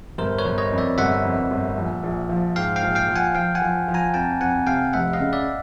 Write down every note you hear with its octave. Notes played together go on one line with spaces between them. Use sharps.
G1 A#4 C5
B4 C#5
G1
C#5 D#5
F2
D5 E5
G1 E5 F#5
F2
G1
A#1
A#1
F3
G#2 F5 G5
F5 G5
A#1
F5 G5
F3
F#5 G#5
F3 F5 G5
F#5 G#5
F3
F3
G#5 A#5
F2 G5 A5
F2 F#5 G#5
C3 F5 G5
F1 E5 F#5
D#5 F5
C#3
D5 E5